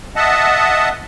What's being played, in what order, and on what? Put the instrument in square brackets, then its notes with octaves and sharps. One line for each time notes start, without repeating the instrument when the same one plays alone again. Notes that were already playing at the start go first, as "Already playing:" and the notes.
[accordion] D#5 E5 F#5 A5